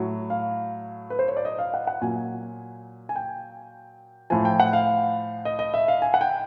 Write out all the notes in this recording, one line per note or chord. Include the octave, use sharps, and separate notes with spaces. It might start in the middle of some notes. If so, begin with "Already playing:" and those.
Already playing: A2 F#3
F5
B4
C5
C#5
D5
D#5
F5
F#5
F#5
A#2 F#3 G#5
G#5
G5
A2 F3 G#5
G5
F#5
F5
D#5
D#5
E5
F5
G#5
F#5
G5